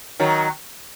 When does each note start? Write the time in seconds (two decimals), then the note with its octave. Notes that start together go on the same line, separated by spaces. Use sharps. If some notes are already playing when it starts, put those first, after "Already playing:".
0.20 D#3 F#3